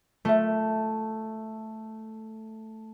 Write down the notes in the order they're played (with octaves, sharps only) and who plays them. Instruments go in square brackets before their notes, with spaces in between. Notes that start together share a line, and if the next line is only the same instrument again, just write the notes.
[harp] A3 [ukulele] F4 E5